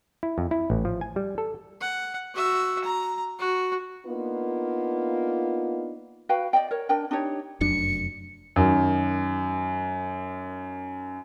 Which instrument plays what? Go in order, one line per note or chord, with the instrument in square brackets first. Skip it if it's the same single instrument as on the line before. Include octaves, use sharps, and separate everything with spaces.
[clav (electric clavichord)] E4
F2
E4
A1
F3
G#5
G3
A4
[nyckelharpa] F#5
F#4 E5
A#5
F#4
[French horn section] A#3 B3 D4 D#4 F4
[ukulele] F#4 B4 F5 G5
D5 D#5 G5
A#4 C#5
D4 A#4 G5
D4 D#4 G4 C#5
[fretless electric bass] F1 F#2 D4 [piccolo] C#7
[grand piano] F#2 D#3